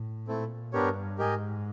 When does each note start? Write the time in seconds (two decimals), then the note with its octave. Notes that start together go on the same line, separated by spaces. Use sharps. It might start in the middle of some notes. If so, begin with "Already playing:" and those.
Already playing: A2
0.28 A#2 A3 C4 E4 A4
0.73 G2 B3 D4 G4 A#4 C#5
1.18 G#2 G4 A#4 D#5 G#5